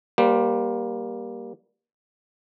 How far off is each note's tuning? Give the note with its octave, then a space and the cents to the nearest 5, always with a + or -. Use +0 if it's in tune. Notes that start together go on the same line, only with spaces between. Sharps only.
G3 +0 A#3 +15 C5 -25